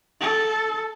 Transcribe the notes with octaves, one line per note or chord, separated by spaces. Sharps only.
A4